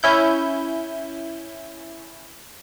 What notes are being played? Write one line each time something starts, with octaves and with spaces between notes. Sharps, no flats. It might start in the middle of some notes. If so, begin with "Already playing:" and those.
C#4 E4 G6